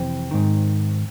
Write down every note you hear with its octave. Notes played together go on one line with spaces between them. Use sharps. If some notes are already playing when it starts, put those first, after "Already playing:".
Already playing: F2 C3 E3 C4
G#2 D#3